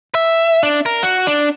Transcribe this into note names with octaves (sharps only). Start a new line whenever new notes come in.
E5
D4
A#4
F#4
D4